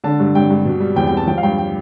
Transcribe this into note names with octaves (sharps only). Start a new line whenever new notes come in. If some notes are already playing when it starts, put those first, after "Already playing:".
D3 A5
G2
G2 G5
G2
B2
G3
E2 G5
G3 G5
A5
F3 G5
F5
G2 G5
G5